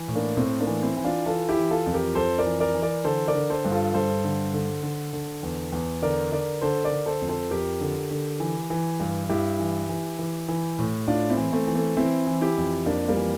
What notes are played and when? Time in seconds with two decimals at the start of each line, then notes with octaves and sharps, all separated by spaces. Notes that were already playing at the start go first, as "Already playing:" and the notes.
Already playing: E3
0.08 A2
0.15 A#3 D4
0.37 A2 A3 C4
0.60 A#3 D4
0.67 E3
0.82 C4 E4
0.97 E3
1.04 D4 F4
1.26 E3 F4 A4
1.48 E4 G4
1.56 E3
1.71 F4 A4
1.86 F2
1.93 G4 A#4
2.15 F2 A4 C5
2.38 A#4 D5
2.46 E3
2.60 A#4 D5
2.75 E3
2.82 A#4 D5
3.04 D3 A4 C5
3.28 A#4 D5
3.35 D3
3.50 A4 C5
3.65 G2
3.72 F4 A4
3.94 G2 A4 C5
4.24 D3
4.53 D3
4.83 D3
5.13 D3
5.43 E2
5.72 E2
6.02 D3 A#4 D5
6.31 D3 A#4 D5
6.61 D3 A4 C5
6.84 A#4 D5
6.92 D3
7.06 A4 C5
7.21 F2
7.29 A4 C5
7.51 F2 G4 A#4
7.81 D3
8.11 D3
8.40 E3
8.70 E3
9.00 G2
9.29 G2 E4 G4
9.59 E3
9.89 E3
10.19 E3
10.48 E3
10.79 A2
11.08 A2 D4 F4
11.30 C4 E4
11.37 E3
11.53 A3 C4
11.67 E3
11.75 A3 C4
11.97 E3 C4 E4
12.27 E3
12.41 E4 G4
12.57 F2
12.86 F2 A#3 D4
13.08 G3 A#3
13.16 E3